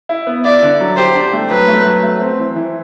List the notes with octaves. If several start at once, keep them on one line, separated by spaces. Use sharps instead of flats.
E4
B3
E4 D5
D3
F#3
G4 C5
D4
A3
F#3 B4
A3
F#3
A3
C4
E3
E3